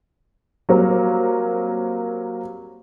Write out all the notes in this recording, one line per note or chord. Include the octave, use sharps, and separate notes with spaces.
F#3 G3 A#3 C4